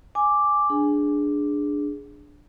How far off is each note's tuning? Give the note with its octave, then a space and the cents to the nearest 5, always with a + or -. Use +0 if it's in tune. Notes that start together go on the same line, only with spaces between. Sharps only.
G#5 +0 D6 +0
D4 +0 G#4 +0